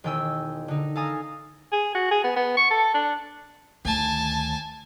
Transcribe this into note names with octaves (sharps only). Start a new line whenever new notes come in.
E1 D#3 G5 G#5 E6
D3 D#4
A4 F5 G#5 A#5 D#6
G#4
F#4
G#4
B3
B3
C#6
A4
D4
D2 D#3 G#5 A5